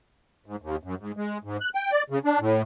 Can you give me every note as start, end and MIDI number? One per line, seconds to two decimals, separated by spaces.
0.46 0.56 44
0.62 0.76 39
0.83 0.95 42
0.99 1.12 44
1.17 1.38 56
1.43 1.57 44
1.60 1.69 90
1.75 1.91 79
1.91 2.03 74
2.10 2.19 49
2.25 2.39 62
2.39 2.62 45